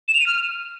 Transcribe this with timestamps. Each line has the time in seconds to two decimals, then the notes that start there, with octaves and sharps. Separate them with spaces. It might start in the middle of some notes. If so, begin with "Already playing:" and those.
0.08 E7
0.14 F7
0.20 D#7
0.26 F6